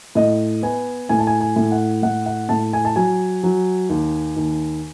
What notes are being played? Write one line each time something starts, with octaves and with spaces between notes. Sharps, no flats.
A2 D#5
B3 G#5
A2 G#5
A5
G#5
G#5
A2
F#5
A2 F#5
F#5
A2 A5
G#5
A5
F#3 G#5
F#3
D#2
D#2